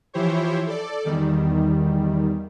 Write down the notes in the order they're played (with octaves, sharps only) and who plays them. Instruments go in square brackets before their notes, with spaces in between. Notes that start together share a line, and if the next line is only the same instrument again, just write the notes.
[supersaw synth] E3 F3 E4 G4 C5 C#5
A4 D5
E2 D#3 G3